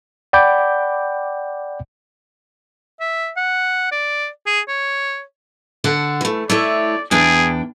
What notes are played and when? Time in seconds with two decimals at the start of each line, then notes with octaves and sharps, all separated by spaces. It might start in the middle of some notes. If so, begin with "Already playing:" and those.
0.33 D5 F#5 G5 B5 D6 G6
3.00 E5
3.36 F#5
3.91 D5
4.46 G#4
4.68 C#5
5.84 D3 F#5 A5
6.21 E3 A3
6.50 A3 E4 C#5 D5
7.11 E2 D4 G#4 G5